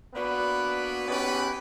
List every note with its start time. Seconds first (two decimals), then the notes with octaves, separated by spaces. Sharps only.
0.14 A#3 B3 D4 F#4 B4
1.08 B3 C#4 D#4 G4 G#4 B4